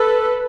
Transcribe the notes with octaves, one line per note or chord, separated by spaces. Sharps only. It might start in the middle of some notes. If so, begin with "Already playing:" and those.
Already playing: A4 B4